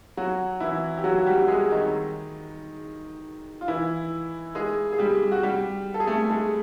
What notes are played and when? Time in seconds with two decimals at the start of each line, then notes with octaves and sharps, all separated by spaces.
0.17 F#3 F#4
0.60 E3 E4
0.98 G4
1.04 F#3 F#4
1.19 F#4
1.26 G3 G4
1.48 G#3 G#4
1.71 D#3 D#4
3.61 F4
3.68 E3 E4
4.55 G#3 G#4
4.93 G#4
4.98 G3 G4
5.31 F#4
5.43 G3 G4
5.94 A4
6.00 G#4
6.07 A3 A4
6.24 A4
6.30 G#3 G#4